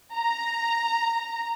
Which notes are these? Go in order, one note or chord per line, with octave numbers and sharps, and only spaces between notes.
A#5